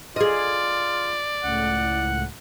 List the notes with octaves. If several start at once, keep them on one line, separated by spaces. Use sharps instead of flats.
F4 G#4 D5 D#5
C#2 A2 F#5